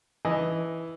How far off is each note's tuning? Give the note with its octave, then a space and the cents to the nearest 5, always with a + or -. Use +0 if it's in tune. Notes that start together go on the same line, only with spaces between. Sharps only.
E3 +0 D#5 +0